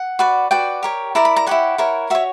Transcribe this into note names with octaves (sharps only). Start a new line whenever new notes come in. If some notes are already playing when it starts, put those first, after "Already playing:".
Already playing: F#5
F#4 B4 D5
F#4 B4 D5 G5
G4 A#4 C#5
E4 A#4 D5 A#5
B5
A#5
E4 G4 C#5 F#5
E4 A#4 C#5
F#4 C#5 E5